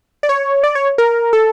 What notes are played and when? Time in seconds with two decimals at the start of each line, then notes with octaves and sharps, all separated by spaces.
0.23 D5
0.29 C#5
0.64 D5
0.75 C#5
0.98 A#4
1.33 A4